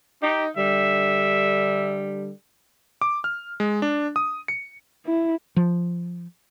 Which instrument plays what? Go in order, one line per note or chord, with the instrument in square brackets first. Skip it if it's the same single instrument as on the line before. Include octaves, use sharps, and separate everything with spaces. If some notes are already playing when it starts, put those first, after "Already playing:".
[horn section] D#4 [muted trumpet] G4
[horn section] D3 G3 [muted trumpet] E5
[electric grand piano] D6
F6
G#3
D4
D#6
C#7
[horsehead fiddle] E4
[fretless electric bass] F3